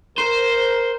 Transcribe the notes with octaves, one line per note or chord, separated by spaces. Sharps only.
A#4 C5